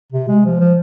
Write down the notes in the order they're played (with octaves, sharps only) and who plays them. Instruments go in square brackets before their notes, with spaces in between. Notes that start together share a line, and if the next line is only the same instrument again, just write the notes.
[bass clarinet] C3
G#3
F3
F3